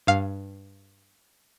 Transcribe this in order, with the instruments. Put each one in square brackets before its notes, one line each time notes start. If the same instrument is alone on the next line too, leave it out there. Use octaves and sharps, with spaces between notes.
[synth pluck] G2 F5